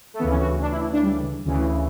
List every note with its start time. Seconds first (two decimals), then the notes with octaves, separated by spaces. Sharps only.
0.14 A3
0.19 D2 C#3 E3 B3
0.30 C#4
0.40 F#4
0.61 D4
0.71 E4
0.93 D4
1.03 G3
1.45 D2 C#3 E3